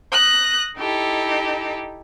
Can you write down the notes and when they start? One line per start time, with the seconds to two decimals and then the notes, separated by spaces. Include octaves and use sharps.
0.13 D#6 F#6 A#6
0.78 D#4 E4 G4 A4